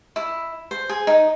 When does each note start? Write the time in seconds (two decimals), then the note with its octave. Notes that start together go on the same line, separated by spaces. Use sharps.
0.16 E4
0.71 C5
0.89 G#4
1.07 D#4